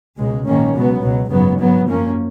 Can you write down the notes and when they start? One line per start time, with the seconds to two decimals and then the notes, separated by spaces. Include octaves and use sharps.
0.17 C#2 B2 G#3
0.45 A#1 G#2 D#3 A#3 C#4
0.73 C#2 B2 F#3 B3
1.01 C#2 B2 F#3
1.29 G#1 F#2 C#3 F#3 B3
1.57 G#2 F#3 B3
1.86 F#2 F3 A#3 C#4